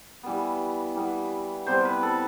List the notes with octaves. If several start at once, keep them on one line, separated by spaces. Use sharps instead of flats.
E3 G3 B3
E3 G3 B3
C3 G3 B3 C5
B4
A4